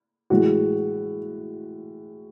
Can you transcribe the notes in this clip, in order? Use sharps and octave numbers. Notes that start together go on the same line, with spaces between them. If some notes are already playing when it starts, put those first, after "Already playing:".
A2 E3 G#3 F#4